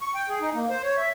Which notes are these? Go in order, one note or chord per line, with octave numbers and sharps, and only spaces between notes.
C#6
G5
G#4
D#4
A#3
C5
C#5
E5